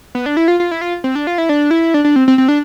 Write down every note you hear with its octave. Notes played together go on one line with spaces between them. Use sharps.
B3
D4
E4
F4
F4
E4
F4
C4
D4
F4
E4
D4
E4
D4
D4
C4
C4
C4
D4